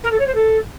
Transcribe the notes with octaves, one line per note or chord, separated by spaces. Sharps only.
A#4
A4
C#5
C5
A4